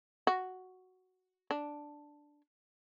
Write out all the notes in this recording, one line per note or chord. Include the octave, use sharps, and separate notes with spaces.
F#4
D4